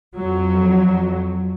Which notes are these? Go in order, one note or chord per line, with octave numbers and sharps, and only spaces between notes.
F2 F#3